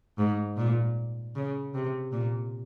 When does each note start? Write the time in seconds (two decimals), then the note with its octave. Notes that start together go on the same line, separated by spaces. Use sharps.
0.18 G#2
0.57 A#2
1.35 C#3
1.74 C3
2.12 A#2